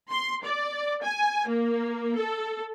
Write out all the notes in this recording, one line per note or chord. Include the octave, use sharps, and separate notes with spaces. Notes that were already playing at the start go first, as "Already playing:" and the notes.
C6
D5
G#5
A#3
A4